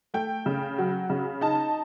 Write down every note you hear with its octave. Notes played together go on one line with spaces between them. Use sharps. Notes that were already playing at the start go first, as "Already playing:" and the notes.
A3 G5
C#3
F#3
C#3
D#4 A5